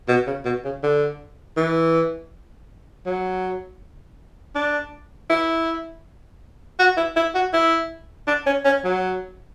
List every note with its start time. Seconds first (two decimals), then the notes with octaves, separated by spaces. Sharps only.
0.08 B2
0.27 C#3
0.45 B2
0.64 C#3
0.83 D3
1.57 E3
3.06 F#3
4.55 D4
5.30 E4
6.79 F#4
6.97 E4
7.16 E4
7.35 F#4
7.53 E4
8.27 D4
8.46 C#4
8.65 C#4
8.84 F#3